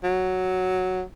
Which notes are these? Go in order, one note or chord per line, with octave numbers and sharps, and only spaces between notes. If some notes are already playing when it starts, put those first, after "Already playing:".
F#3